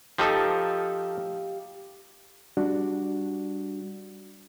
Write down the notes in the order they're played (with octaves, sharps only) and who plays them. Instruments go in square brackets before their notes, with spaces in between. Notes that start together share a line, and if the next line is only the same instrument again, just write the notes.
[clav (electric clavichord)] F3 D#4 A4 [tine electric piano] G4 F5
[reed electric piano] G3 D4 F#4